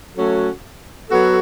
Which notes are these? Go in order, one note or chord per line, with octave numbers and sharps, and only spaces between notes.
F#3 A3 C#4 F#4 A4
F#3 B3 F#4 A4